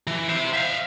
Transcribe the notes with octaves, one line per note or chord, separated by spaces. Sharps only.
E3
C5 E5
E5 F5